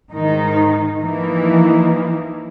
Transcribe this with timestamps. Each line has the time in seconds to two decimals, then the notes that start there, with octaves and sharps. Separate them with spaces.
0.11 G#2 D#3 D#4
1.00 E3 F3 A#3 D#4 E4